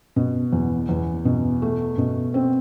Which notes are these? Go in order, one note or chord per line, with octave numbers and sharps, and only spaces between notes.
B2
E2
E2
B2
A3
B2
C4